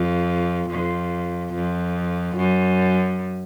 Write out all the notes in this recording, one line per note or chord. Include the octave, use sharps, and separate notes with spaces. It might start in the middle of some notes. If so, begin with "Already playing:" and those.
Already playing: F2
F2
F2
F#2